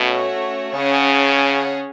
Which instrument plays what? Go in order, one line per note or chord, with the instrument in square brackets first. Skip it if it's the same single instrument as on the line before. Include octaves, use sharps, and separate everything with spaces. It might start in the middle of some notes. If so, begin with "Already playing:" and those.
Already playing: [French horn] B2 [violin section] A3 C#4 F#4 C#5
[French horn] C#3 [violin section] C#4 G#4 C#5 F#5 A5